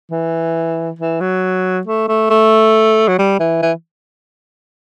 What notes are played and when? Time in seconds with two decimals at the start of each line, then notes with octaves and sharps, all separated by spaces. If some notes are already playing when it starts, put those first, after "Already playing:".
0.11 E3
0.99 E3
1.21 F#3
1.87 A3
2.09 A3
2.31 A3
3.08 F#3
3.19 G3
3.40 E3
3.63 E3